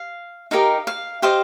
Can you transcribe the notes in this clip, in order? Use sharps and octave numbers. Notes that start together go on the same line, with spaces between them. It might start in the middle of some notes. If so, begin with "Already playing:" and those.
Already playing: F5
D#4 G4 A#4 D#5 F5
F5
G4 C5 D#5 F5